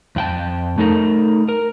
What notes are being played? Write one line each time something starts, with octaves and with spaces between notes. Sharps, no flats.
F2 G5 A5
A3 D#4 A4 A#4
A#4